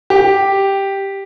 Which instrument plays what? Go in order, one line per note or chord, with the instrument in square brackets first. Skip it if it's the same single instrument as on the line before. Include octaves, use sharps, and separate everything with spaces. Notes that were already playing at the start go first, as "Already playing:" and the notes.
[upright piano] G4